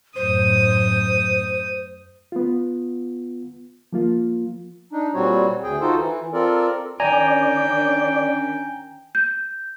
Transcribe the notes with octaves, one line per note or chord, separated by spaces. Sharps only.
F#2 A2 C5 D#6
B3 F4
F3 A#3 F4
D4 D#4
A#2 G3 C4 F#4 C#5
D2 G#4 G5
D#4 F4 F#4 A4 C5
E3
C4 F4 A4 A#4 D5
D#3 C#4 D4 D5 G5 G#5 A#5
G6